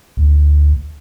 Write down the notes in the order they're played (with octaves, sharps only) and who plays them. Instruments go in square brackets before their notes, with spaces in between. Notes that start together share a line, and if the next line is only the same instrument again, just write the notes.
[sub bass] D2